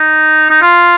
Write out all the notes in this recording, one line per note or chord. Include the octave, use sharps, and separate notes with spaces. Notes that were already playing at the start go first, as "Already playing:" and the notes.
Already playing: D#4
D#4
F4